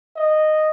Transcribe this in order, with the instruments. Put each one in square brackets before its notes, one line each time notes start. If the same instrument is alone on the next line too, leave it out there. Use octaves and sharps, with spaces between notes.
[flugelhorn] D#5